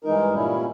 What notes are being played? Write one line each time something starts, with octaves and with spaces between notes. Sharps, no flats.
G2 E3 G#3 D#4 A#4
A#2 G3 C#4 E4